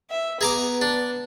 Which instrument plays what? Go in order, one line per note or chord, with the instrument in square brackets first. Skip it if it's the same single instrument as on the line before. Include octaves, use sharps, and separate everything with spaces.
[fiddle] E5
[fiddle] B3 [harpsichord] G#4 A#5 D6
[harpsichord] D4